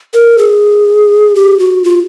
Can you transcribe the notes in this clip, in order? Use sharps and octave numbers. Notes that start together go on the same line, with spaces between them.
A#4
G#4
G4
F#4
F4